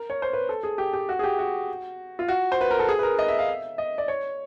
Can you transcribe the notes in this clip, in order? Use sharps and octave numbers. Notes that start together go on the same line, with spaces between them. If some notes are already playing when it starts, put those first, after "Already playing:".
Already playing: A#4
C#5
C5
B4
A4
G#4
G4
G4
F#4
G#4
G4
F#4
F4
F#4
C5
B4
A#4
A4
G#4
B4
A#4
D#5
E5
F5
E5
D#5
D5
C#5